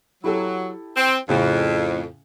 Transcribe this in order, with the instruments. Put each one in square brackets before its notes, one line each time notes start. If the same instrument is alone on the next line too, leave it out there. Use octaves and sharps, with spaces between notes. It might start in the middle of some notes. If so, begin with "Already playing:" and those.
[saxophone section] F#3 [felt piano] E4 G4 A4
[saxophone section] C4
[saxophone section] F2 [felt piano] A2 C#3 C#4